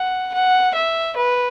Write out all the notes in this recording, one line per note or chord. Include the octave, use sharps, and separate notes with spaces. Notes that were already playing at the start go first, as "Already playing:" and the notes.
Already playing: F#5
F#5
E5
B4